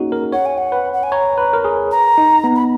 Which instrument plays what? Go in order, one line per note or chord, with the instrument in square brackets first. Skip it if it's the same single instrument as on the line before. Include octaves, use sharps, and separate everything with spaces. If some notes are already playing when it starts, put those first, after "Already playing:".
Already playing: [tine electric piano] A#3 C#4 D#4 F#4 G#4
A#4
[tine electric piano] C#5 [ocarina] F#5
[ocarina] G#5
F#5
[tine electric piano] B4
[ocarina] F#5
G#5
[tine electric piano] C#5 [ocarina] A#5
[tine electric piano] B4
A#4
G#4
[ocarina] A#5
[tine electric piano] D#4
B3
[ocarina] B5